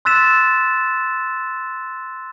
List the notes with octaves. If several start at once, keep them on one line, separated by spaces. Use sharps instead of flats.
C6 E6 F#6 A6 B6 E7